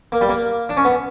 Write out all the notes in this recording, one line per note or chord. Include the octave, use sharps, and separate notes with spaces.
A#3
G3
A#3
D4
C#4
B3